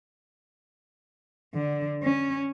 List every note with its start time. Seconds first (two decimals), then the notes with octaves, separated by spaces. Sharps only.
1.54 D3
2.03 C#4